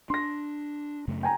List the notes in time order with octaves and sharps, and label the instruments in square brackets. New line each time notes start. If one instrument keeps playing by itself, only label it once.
[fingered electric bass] D4 [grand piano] C6 A#6
[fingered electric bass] F#2 C#3 A3
[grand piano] G5 G#5 A#5